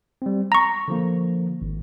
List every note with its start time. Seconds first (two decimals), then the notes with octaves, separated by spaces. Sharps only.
0.22 G3 C4
0.52 A#5 C#6 A#6
0.88 D3 F3 A#3
1.62 G#1